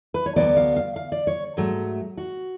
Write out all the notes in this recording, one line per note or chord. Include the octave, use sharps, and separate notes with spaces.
B4
C#5
D2 C#3 F#3 B3 D5
F5
F5
F5
D5
C#5
G#2 F#3 A3
F#4